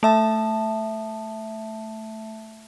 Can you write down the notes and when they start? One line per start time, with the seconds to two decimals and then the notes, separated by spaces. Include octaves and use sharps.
0.03 A3 E5 A5